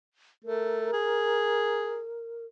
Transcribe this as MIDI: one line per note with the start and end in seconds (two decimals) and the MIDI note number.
0.45 0.88 57
0.45 2.45 70
0.93 2.03 68